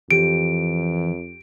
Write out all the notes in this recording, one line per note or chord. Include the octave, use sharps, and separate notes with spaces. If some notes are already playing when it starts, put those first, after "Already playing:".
F2 E3 G4 D7